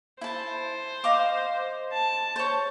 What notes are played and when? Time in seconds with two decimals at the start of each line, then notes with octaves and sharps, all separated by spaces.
0.21 E4 C5 A5
1.04 D#5 F5 D6
1.92 A5
2.36 C5 C#5